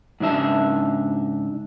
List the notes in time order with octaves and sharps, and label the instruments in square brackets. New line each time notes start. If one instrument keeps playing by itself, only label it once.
[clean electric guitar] G#2 C#3 D4 E5 A5